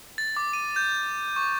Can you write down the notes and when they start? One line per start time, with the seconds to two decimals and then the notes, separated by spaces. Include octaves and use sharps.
0.18 A6
0.37 D6
0.53 D#7
0.76 G6
1.36 C#6